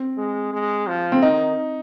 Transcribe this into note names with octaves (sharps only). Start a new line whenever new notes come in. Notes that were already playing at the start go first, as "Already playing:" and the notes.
Already playing: C4
G#3
G#3
F3
C4
D#3 D#4